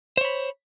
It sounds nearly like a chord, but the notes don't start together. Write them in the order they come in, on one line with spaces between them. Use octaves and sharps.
C5 C#5 B5